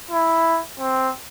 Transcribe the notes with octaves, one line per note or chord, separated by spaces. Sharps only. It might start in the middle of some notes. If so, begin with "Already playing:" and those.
E4
C4